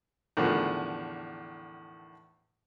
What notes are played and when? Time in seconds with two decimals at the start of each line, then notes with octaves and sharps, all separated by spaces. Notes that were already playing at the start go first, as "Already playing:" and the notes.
0.37 E2 A2 D3 D#3 F3